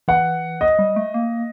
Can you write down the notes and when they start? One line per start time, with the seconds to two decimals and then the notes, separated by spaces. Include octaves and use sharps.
0.08 E3 F#5
0.61 D#5
0.79 G3
0.96 A3
1.14 A#3